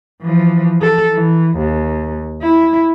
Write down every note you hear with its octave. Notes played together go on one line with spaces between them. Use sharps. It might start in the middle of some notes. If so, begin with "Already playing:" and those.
E3 F3
A4
E3
D#2
E4